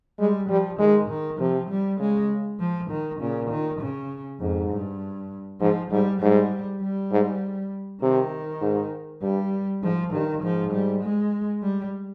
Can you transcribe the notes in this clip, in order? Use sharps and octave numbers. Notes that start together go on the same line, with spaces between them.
G3 G#3
F3 G3
D#3 G#3
D#3
C3 F3
G3
C#3 G#3
F3
D#3
A#2 C#3
D#3
C#3
F2 G#2
G2
G#2 F3
G#2 G3
G#2 G3
G3
G#2
C3 D#3
G#2
G2 G3
G#2 F3
G2 D#3
G#2 F3
G3
G#3
G3